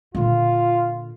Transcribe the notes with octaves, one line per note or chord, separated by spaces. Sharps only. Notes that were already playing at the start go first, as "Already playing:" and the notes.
A#2 D3 F4